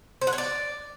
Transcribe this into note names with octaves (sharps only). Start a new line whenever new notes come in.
C5
F#5
C#5
D5